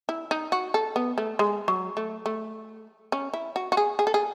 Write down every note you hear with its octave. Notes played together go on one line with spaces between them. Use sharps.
E4
D#4
F#4
A4
B3
A3
G#3
F#3
A3
A3
C#4
E4
F#4
F#4
G#4
G#4
A4
G#4